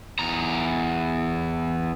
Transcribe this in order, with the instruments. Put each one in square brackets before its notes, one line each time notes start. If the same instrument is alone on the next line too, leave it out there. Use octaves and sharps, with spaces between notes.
[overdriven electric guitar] E2 A#5